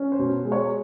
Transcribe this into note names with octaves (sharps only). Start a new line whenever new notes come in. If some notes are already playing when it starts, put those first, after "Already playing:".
Already playing: C#4
C5
B2
G#3
C#5